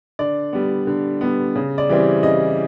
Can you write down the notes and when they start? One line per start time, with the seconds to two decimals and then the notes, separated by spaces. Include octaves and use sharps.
0.19 D3 D5
0.53 G3 B3
0.87 D3
1.21 G3 B3
1.56 C#3
1.78 D5
1.89 E3 G3 C4
2.23 C#3 D#5